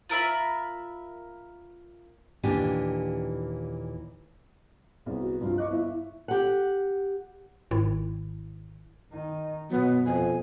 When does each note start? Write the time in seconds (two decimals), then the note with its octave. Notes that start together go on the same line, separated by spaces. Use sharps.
0.09 F4 A#4 E5 B5
2.43 D#2 A#2 E3 D4 G4 G#5
5.06 C2 B3 G#4
5.20 F#4
5.40 C2 G2 F3 F4
5.58 D#5 C#6 D6 F#6
5.70 G1 E4 E5 F5
6.28 G4 F#5
7.71 G#1 G#2 D#3 E4
9.11 D#3 D#4
9.71 F#2 B2 F#3 B3
10.05 F2 G#5